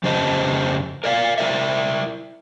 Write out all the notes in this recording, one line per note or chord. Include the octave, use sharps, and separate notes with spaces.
F2 C#3 G4 C5 D#5 A5
A#4 D5 F5
E4 A#4 D5 E5